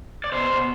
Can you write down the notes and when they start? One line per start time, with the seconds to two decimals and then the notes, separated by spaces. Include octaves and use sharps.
0.24 D5
0.32 B2 C5
0.50 B2